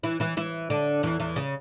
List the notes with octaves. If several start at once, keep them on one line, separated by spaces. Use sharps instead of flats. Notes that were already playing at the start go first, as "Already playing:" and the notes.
E3 E4
E3 E4
E3 E4
D3 D4
E2 E3
E2 E3
C#3